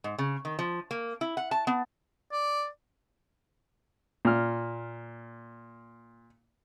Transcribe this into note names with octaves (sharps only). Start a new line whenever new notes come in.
G#2
C#3
D#3
F3
A#3
E4
F#5
A5
B3
D5
A#2 F6